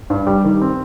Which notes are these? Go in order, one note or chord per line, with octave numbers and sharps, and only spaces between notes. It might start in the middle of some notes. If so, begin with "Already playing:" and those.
G2
G3
D#3
C4